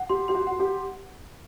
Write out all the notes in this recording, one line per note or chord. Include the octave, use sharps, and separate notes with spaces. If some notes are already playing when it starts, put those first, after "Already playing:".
Already playing: F#5
G4 C6
G4 C6
F#4
F#4 F#5
G4